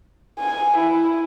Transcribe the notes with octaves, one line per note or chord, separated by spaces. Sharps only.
G#5
E4